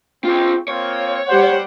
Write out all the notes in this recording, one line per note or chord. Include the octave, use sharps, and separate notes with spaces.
C4 F4 G#4
A#3 C4 F4 C#5
G3 G4 C5 F#5